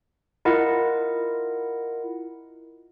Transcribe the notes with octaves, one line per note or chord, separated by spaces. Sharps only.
E4 F4 A#4 D#5 F#5